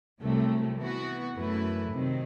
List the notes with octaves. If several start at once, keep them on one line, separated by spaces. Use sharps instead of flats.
C2 C3 F#3 A3
E3 B3 F#4
F#2 E3 A3 E4 B4
C3 D#3 F#3 C4